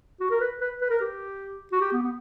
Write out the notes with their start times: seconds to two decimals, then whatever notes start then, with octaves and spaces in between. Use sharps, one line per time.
0.20 F#4
0.30 A#4
0.41 B4
0.61 B4
0.81 B4
0.90 A#4
1.01 G4
1.72 F#4
1.81 G4
1.92 B3
2.02 B3